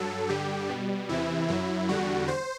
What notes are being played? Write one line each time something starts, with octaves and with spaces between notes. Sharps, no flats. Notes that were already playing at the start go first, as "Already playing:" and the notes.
Already playing: G2 F#3 A4
G2 D3 G3 G4
B2 G3
E2 C3 E3 E4
F#2 F#3 E4
E2 D3 G3 F#4
C5